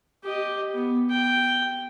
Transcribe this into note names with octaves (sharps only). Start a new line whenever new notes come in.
G4 D#5
B3
G5